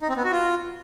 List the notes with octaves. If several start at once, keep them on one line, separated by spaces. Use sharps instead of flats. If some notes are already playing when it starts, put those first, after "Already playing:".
D#4
C4
B3
F#4
F4